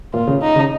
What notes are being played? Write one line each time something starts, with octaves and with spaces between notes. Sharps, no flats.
A#2 F4
C#3
D#4
C#3